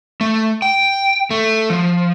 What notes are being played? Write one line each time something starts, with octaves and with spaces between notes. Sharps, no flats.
A3
G5
A3
F3